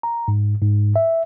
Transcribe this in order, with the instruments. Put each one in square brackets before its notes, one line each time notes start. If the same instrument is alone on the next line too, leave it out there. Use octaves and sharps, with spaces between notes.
[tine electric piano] A#5
G#2
G#2
E5